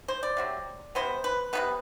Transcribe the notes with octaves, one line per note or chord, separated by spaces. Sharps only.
C5
D5
C3 F#3 C4
C3 G3 B3 C5
B4
C3 G3 B3 B4